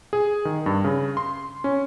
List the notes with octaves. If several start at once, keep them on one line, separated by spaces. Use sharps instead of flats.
G#4
D#3
G2
C#3
C6
C#4